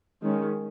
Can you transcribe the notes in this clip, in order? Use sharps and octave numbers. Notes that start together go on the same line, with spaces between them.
D#3 G#3 C#4